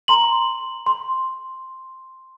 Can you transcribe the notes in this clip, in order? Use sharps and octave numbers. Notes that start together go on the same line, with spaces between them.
A#5 C6 F#7
C6